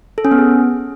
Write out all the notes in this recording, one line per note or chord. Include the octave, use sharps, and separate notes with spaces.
A4
C#4
B3
G#4